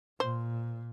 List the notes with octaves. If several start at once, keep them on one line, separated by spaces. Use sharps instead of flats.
A#2 C5